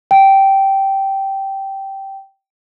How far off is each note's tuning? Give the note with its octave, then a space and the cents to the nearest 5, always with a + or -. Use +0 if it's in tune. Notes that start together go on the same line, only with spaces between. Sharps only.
G5 -10